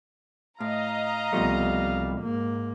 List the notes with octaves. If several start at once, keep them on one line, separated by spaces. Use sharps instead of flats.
A2 D#5 F5 A#5
C2 B2 F3 G3 A3
G#2 A#3